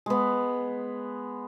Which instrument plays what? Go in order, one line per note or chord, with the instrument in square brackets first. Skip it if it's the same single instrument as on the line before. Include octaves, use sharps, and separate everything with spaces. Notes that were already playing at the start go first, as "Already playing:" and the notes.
[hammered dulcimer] G#3 B3